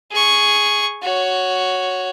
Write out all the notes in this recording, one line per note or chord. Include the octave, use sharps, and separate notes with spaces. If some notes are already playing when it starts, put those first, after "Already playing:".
G#4 C#6
F#4 C#5